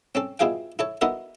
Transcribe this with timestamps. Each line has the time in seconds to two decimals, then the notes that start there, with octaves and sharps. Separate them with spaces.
0.15 C4 C#4 A4
0.39 B2 E4 F4 G#4 F5 G5
0.79 E4 A4 C#5
1.01 B3 D#4 E4 F#4 A4 A#4